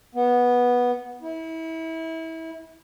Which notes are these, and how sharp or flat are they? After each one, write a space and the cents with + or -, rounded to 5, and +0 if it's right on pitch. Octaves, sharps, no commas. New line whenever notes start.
B3 -10
E4 -25